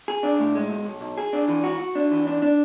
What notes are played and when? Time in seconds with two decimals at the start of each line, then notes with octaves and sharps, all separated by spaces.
0.08 G#4
0.23 D4
0.39 A2
0.55 G#3
0.70 B1
0.85 B1
1.01 B1
1.18 G#4
1.33 D4
1.48 E3
1.64 F#4
1.80 F#4
1.95 D4
2.11 E3
2.27 D4
2.42 D4